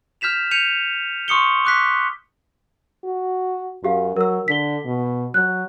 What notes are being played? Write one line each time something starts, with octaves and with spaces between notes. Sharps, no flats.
F6 G6 B6 E7 F7
G6 C#7 D#7 F7
C6 C#6 D#6 C#7 G7
D6 F#6 B6
F#4
F#2 F#4 G4 F5
F#3 A#4 E6
D3 B6 G7
B2
F#3 F#6